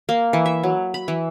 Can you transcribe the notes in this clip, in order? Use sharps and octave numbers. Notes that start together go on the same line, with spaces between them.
A#3
E3
E5
F#3
B5
E3